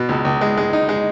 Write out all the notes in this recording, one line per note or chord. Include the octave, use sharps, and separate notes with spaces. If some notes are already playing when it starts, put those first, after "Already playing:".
Already playing: B2
C#2
C#2
G#3
G#3
D#4
G#3